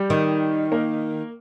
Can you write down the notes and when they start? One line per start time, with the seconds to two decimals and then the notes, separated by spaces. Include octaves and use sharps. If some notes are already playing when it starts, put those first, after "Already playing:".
Already playing: G3 G4
0.10 D#3
0.72 A#3 A#4